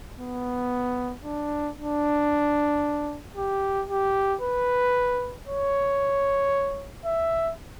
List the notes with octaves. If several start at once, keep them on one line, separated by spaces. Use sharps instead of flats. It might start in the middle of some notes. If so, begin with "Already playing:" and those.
B3
D4
D4
G4
G4
B4
C#5
E5